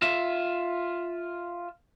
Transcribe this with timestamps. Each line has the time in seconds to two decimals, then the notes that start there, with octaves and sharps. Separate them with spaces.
0.02 F4 E5